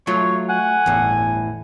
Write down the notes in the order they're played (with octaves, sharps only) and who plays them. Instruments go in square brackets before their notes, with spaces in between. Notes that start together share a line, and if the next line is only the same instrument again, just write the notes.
[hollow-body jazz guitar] F#3 F4 [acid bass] A3 [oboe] C#5
[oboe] F#5 [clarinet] G#5
[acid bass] G1 [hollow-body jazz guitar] E2 A2